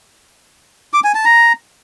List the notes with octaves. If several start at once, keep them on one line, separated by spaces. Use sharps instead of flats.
D6
G#5
A5
A#5